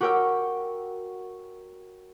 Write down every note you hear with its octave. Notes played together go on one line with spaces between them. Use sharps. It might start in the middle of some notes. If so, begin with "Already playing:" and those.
F#4 G4 A#4 C#5 G5 E6